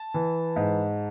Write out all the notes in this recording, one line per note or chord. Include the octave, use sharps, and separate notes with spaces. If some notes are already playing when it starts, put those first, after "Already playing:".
Already playing: A5
E3
G#2